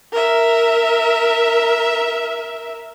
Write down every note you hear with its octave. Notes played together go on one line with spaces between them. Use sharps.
A#4 E5